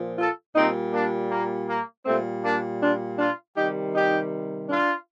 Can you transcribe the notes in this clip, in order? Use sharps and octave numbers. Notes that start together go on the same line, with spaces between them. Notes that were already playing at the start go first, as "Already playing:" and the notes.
Already playing: A#2 F3
F4 A4
A#2 G3 C4 D#4
A#3 D4
A#3
A#3
A#2 G3 A3 C4
A#3 D4
D4 F4
D4 F4
C3 D#3 G3 D#4 G4
D#4 G4
D4 F4